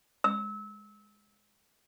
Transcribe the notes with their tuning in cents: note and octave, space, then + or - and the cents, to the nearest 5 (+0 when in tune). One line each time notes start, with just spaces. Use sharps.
E6 -30